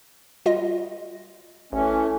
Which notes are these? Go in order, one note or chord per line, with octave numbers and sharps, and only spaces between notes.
G3 F4 D#5
A1 E3 A3 C#4